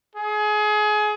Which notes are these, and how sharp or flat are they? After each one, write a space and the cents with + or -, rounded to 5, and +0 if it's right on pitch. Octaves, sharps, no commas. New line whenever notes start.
G#4 +25